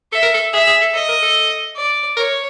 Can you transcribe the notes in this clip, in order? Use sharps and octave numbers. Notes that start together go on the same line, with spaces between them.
A4 E5
A#4
A4
G#4 E5
G#4
A4
A4 D#5
A#4
A4
D5
A#4 C#5